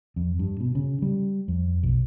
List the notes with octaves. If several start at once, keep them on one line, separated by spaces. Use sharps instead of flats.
F2
G2
B2
C#3
G3
F2
B1